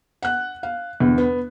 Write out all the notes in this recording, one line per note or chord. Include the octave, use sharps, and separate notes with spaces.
F#5 F#6
F5
G1 E2
B3